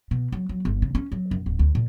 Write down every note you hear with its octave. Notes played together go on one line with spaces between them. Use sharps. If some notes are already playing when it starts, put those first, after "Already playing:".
B2
F#3
F#3
G1
C#3
C#4
F#3
F#2
D1
D2
A#2